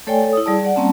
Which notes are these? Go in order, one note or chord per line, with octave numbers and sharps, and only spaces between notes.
A3 A4 C#5 D5 G5 G#5
A4 C#5
E4 D#6
G3 G#4 D5 A5
D5 F#5
G3 A#3 C4 C#4 A5